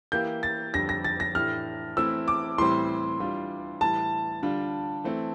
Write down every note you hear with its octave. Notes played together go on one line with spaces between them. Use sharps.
E3 A#3 E4 G4 G6
A6
F2 D3 G3 D4 G4 A#6
A#6
A6
A#6
A2 E3 A3 D4 G4 F6
E3 A3 C4 E4 E6
D6
A2 E3 G3 C4 C6
E3 G3 D4 F4
A2 E3 G3 A5
D3 G3 D4 F4
E3 A3 C4